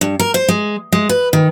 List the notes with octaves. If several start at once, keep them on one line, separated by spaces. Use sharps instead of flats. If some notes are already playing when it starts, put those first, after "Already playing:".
G2
A#4
C5
G#3
G#3
B4
D#3